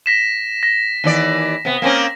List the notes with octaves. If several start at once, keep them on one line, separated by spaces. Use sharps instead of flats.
A#6 B6 E7
A#6
D#2 E3 D5
C3 B3
A#3 C4 C#4